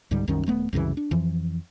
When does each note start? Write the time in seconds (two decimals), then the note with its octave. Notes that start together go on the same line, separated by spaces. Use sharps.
0.11 C#2 G#2 D3 G3
0.28 C2 F#2 D#3 C#4
0.46 D#1 A3 B3
0.73 C2 F#2 C#3 E3
0.97 D4
1.11 F2 E3 F3